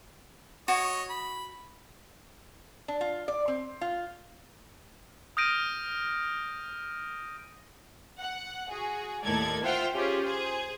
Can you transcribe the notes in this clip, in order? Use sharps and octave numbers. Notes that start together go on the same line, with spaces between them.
F#4 C#5 D#5
B5
D4
F4
D5
C4
F4
D#6 F6 G6 A#6 D7 D#7
F#5
F#4 G#4
D#2 A2 A4 A#4 D5 G#6
F4 C5 E5 F#5 G5 F6
C#4 F4 G4 G#4 C5
G#4 C5